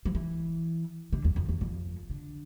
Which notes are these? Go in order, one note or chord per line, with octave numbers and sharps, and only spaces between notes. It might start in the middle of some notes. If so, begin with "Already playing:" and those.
F3
E3
D3
E2
F2
E2
F2
D3